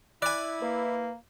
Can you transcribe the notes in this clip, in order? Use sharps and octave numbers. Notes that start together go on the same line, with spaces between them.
E4 D5 G#5 F#6
A#3 B4